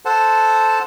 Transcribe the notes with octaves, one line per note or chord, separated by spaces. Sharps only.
A4 C5 F#5 A5